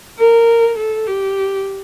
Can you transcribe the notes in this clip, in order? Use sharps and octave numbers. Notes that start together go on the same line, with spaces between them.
A#4
A4
G4